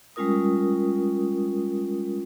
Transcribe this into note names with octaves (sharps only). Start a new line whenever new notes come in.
G3 G#3 C#4 F4 A#4 D#6